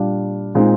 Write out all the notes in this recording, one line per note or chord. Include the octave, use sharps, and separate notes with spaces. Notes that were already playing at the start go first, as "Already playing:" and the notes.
Already playing: A#2 G3 D4 F5
A#2 G#3 C4 D#4